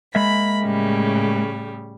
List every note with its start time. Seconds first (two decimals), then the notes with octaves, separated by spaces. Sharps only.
0.15 G#3 A#3 E5 B5
0.62 A2 C#3 G3